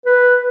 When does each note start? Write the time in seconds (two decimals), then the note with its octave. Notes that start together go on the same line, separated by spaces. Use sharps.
0.06 B4